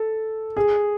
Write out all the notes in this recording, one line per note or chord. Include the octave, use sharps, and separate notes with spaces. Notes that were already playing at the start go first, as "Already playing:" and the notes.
Already playing: A4
G#4